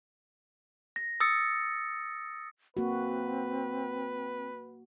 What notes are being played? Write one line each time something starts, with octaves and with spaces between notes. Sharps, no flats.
A#6
D#6 E6 A6 C#7
A#3 C4 F#4 B4